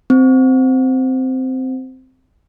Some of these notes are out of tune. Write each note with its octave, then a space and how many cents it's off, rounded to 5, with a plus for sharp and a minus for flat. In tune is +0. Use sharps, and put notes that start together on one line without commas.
C4 -10